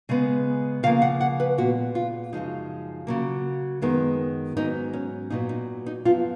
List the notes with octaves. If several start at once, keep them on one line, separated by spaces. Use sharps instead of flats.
C#3 G#3 B3
C#3 F3 A#3 F5
F#5
F#5
B4
A#2 G#3 B3 F#4
F4
F#2 C#3 F3 G#3 D#4
C#3 F#3 A#3
F#2 D#3 G#3 B3
G#2 F#3 B3 D#4
C#4
A#2 F#3 B3 D#4
D#4
D#4
F#2 F3 B3 F4